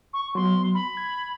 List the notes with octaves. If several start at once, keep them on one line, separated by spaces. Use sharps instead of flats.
C#6
F#3 B3 C6
B5
G#6